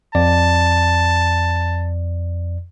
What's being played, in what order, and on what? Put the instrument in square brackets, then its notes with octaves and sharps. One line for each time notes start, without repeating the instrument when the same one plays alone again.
[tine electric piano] F2 D5 [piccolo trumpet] A5